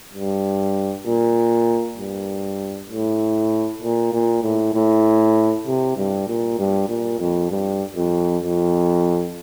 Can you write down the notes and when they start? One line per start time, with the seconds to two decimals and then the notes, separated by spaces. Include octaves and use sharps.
0.14 G2
1.06 A#2
1.98 G2
2.90 A2
3.82 A#2
4.13 A#2
4.43 A2
4.74 A2
5.67 C3
5.97 G2
6.28 A#2
6.59 G2
6.89 A#2
7.19 F2
7.51 G2
7.96 F2
8.43 F2